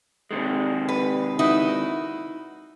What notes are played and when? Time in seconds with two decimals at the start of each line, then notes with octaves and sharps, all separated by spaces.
0.31 C3 D#3 G#3
0.89 B4
1.39 D#4 E4 F#4